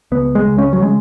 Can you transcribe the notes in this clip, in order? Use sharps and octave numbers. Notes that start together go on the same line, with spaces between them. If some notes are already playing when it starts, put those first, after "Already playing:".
C#2 B3
G#3
C#2
C#4
F#3
C#3 G#3